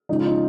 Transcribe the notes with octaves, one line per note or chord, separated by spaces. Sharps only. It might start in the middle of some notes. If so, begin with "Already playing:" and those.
C#3 F3 G#3 D#4
F4
D#4